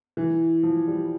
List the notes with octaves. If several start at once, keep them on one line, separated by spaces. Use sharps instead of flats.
E3
F3
G3